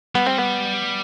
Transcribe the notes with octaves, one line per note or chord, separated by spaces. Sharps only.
G3 B3
C4
B3